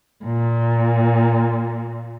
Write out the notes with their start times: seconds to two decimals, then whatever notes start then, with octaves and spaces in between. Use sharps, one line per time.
0.25 A#2